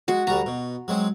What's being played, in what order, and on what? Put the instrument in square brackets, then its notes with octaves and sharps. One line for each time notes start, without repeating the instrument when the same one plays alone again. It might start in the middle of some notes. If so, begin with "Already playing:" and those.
[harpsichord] G#3 [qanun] F#4
[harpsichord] D2 G3 F#4 [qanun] A#5
[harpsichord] B2
F#3 G#3 C4